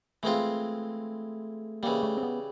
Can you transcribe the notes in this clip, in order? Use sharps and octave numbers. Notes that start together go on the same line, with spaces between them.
E3 G#3 A3 C4 F4
C#3 E3 G3 A#3
A3
C4
B3